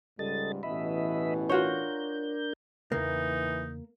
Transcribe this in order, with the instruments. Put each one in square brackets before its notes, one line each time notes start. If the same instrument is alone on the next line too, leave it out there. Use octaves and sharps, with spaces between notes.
[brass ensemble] C#2 G#2 G3 [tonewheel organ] A4 D#5 A6
[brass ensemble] A1 B2 E3 [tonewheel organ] D#5 E5 B5
[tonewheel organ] D4 A#4 G6 [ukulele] F4 F#4 C#5
[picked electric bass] E2 C#3 [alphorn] E3 [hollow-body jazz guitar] A#3 [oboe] D#4